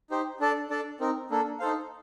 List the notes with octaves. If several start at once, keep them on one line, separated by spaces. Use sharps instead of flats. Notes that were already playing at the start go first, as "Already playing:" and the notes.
D#4 G4 C5
D4 A4 D5 A5
D4 A4 D5 A5
C4 D#4 A#4
A#3 D4 A4
D#4 A4 C5 F5